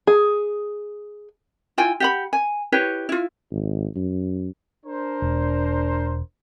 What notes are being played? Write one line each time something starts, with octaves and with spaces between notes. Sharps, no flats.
G#4
E4 F4 G5 G#5
G4 F#5 B5
G#5
E4 G4 B4 C#5
E4 F4
G#1
F#2
D4 A#4 C5
E1